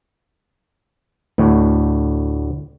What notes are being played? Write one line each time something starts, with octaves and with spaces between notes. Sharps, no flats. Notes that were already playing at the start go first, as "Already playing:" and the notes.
D2 A2